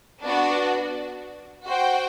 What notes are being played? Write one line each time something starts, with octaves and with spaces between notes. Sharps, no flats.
B3 D4 F#4
F#4 C5 G5